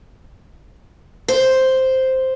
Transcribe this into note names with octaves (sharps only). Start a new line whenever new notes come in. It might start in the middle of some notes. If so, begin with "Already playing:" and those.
C5